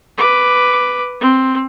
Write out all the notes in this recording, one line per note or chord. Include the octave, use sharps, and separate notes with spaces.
B4 D6
C4